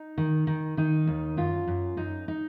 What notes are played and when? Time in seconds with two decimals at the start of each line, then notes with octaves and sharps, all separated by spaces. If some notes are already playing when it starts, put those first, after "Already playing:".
Already playing: D#4
0.18 D#3
0.47 D#3
0.77 D#3 D#4
1.07 D#2
1.37 F#2 F4
1.68 F#2
1.97 F#2 D#4
2.28 D#4